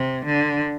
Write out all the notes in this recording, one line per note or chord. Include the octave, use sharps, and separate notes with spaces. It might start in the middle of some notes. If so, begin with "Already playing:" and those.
Already playing: C3
D3